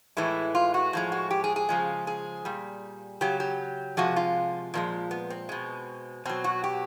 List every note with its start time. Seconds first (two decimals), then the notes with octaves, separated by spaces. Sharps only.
0.17 A2 E3 G#3 E4
0.55 F4
0.74 F#4
0.93 A2 F3 G#3
1.12 F#4
1.31 G4
1.44 G#4
1.56 G#4
1.69 C#3 F3 G#3
2.07 G#4
2.45 A#2 G3
3.21 C#3 F#3 G4
3.40 G4
3.97 C3 F3 G#3 F#4
4.16 F4
4.74 A#2 F3 G#3
5.11 B3
5.30 C4
5.49 B2 G#3
6.25 B2 F#3 C4
6.44 F#4
6.64 G4